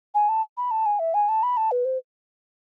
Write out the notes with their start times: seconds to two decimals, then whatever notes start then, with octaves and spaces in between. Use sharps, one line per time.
0.15 G#5
0.29 A5
0.57 B5
0.71 A5
0.86 G#5
0.99 E5
1.14 G#5
1.29 A5
1.43 B5
1.57 A5
1.71 B4
1.85 C5